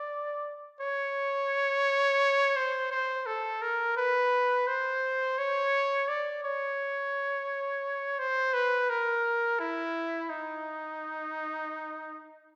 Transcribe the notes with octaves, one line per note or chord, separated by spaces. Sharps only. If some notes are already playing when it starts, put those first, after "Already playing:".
Already playing: D5
C#5
C5
C5
A4
A#4
B4
C5
C#5
D5
C#5
C5
B4
A#4
E4
D#4